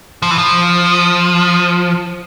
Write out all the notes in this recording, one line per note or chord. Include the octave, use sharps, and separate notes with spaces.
F3
E3
F3